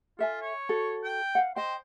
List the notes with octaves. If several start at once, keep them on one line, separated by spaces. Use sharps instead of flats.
F4 A4 E5 G#5
C#5
F#4 A4
G5
F5 F#5
C5 D#5 G5